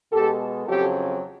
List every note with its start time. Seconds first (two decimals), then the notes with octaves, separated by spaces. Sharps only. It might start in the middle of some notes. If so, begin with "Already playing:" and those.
0.12 B2 G#3 G4 A4
0.67 F2 C#3 F#3 G4 A4